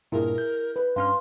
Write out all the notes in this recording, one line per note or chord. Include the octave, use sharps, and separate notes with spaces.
G2 A#2 E4 G#4 A#4
G6
B4
G2 C#4 F5 C6 F6